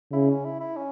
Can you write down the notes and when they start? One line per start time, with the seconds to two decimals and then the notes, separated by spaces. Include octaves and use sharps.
0.12 C#3 E4
0.29 C#4
0.45 E4
0.60 E4
0.76 C#4